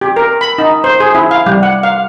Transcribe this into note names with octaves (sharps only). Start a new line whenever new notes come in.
G4
A#4
B5
D#4
C5
G#4
E4
F5
G3
F#5
F5